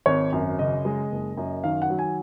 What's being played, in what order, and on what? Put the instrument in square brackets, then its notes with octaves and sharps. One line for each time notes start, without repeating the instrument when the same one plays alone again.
[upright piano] G#1 [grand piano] C#5
[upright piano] F#2
[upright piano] C#3 [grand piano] D#5
[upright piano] G#3
F#1
F#2
[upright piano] D#3 [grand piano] F5
[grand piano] F#5
[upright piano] F#3
[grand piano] G#5